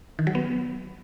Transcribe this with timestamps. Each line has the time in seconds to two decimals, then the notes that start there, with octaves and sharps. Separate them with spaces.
0.19 D#3
0.27 F#3
0.35 B3